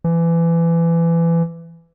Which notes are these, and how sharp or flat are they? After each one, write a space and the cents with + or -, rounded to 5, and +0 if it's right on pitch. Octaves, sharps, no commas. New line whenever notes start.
E3 +25